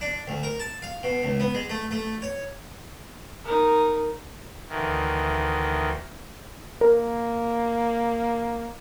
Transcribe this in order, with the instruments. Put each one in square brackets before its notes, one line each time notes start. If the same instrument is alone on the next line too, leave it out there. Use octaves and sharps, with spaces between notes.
[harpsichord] D4
D2
A#4
A5
F5
B2
C#2
B3
G#3
A3
A3
C#5
[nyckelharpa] D#4 A#4
[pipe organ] D2 D#3 E3
[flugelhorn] A#3 [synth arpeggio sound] A#4